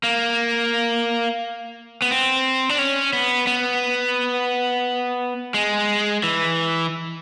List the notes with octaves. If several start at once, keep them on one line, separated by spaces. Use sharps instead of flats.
A#3
B3
C4
D4
C#4
B3
B3
G#3
E3